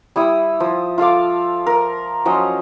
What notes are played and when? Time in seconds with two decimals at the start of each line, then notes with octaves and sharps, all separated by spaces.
0.16 G3 E4 D#6
0.60 F3
0.98 F4 A4 F5 D6
1.67 A#4
2.25 F3 F#3 C#4 D#5